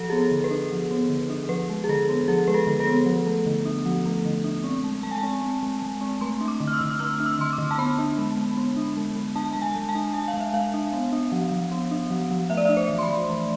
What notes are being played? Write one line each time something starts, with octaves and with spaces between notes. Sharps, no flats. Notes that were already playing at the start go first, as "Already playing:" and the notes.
Already playing: F3 A4
B3 G#4
A4
D3
B4
D4
F3
B3
D3
D4
F3 B4
G#3
G#4
D3 A4
B3
F3 G#4
G#3 B4
A4
D3
A4
B3
F3
A3
D3
D4
F3
A3
D3
D4
C4
G#3
G#3 A5
G#5
A5
C4
C4
G#3
G#3
C4
A3 C6
D4
D6
D3
F6
E6
D3
E6
A3 F6
D4
E6
D3 C6
D6
D3
A5
B3 B5
D4
G#3
G#3
B3
D4
G#3
G#3
D4 A5
G#3 A5
G#5
G#3
A5
D4
D4 G#5
F5
G#3
E5
G#3 F5
D4
B3
D4
F3
F3
B3
D4
F3
F3
A3 E5
D5
D4 E5
C5
E3
C6
B5
E3
A3